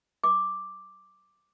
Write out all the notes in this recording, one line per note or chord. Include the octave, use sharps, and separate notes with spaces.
D6